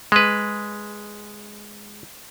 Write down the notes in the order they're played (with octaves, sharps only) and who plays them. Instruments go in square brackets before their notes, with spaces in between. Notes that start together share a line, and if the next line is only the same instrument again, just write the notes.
[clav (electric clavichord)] G#3 B4